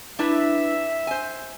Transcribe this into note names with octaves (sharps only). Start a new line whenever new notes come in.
D4 E4 B4 E5
C5 G#5